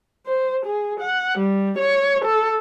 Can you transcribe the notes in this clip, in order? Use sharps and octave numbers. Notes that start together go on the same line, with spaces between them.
C5
G#4
F#5
G3
C#5
A4